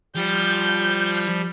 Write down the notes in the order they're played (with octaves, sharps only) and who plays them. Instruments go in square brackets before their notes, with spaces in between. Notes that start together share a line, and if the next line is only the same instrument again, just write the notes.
[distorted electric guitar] F3 [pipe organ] G3 [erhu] G6